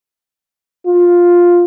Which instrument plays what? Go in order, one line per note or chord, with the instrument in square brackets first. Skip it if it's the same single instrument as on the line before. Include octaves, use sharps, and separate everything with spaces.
[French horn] F4